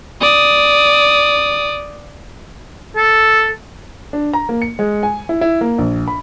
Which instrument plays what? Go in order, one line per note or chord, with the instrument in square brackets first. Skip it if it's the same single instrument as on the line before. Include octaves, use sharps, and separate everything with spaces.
[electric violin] D5 D#6
[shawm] A4
[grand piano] D4
A#5
A#3
C#7
G#3
G#5
E4
E4
A#3
A#1
B5